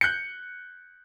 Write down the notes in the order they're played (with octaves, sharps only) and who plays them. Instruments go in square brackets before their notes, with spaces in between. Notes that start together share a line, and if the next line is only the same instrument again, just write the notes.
[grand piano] F#6 G6 C#7